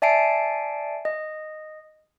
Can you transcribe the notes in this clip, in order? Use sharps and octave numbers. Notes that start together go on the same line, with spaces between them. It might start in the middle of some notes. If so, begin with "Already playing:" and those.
D5 E5 G#5 A5 C7 D7
D#5